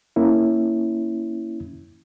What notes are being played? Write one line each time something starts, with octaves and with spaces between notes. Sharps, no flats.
A#3 C#4 E4